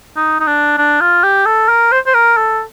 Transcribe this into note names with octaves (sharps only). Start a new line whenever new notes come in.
D#4
D#4
D4
D4
F4
G4
A4
A#4
C5
C5
A#4
A4